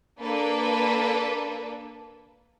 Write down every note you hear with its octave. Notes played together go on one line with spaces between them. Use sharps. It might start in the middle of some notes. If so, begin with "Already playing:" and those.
A#3 D4 A4 B4